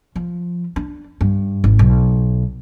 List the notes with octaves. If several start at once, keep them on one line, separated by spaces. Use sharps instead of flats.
F3
D4
G2
G#1
B1